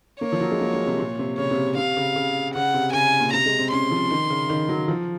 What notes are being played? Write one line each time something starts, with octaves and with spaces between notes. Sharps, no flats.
A#3 C#5
F3
F#3
G#3
A#3
G#3
C3
A#2
C3
C#3 C#5
C3
C3 F5
C#3
C#3
C#3 F#5
C3
C#3 G#5
A#2
C3 A#5
G#3
C4
C#4 C6
F3
D#3
C#3
D#3
F#3
F3